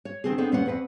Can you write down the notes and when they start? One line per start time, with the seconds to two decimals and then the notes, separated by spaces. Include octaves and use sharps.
0.05 C#5
0.24 D3 D#3 C4 D4 G#4
0.38 B3 C4 D4 D#4 G#4 A4
0.52 D#2 A#2 B3 C#4 C5 F#5
0.66 E2 C4 B4 F#5